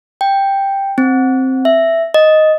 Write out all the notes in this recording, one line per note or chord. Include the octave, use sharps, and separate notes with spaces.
G5
C4
E5
D#5